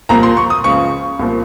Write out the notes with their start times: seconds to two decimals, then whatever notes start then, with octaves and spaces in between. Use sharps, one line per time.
0.09 C2 A#2 F3 A#5
0.23 C6
0.37 C#6
0.50 D#6
0.64 C#2 C#3 F3 C#6
1.19 C2 A#2 F3